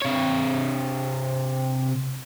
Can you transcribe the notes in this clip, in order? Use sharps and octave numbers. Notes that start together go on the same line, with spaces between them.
C3 C#5